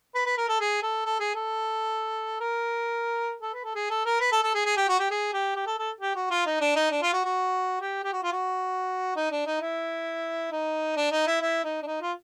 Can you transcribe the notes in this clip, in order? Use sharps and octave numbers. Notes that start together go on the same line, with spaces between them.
B4
B4
A#4
A4
G#4
A4
A4
G#4
A4
A#4
A4
B4
A4
G#4
A4
A#4
B4
A4
A4
G#4
G#4
G4
F#4
G4
G#4
G4
G4
A4
A4
G4
F#4
F4
D#4
D4
D#4
D4
F4
F#4
F#4
G4
G4
F#4
F4
F#4
D#4
D4
D#4
E4
D#4
D4
D#4
E4
E4
D#4
D4
D#4
F4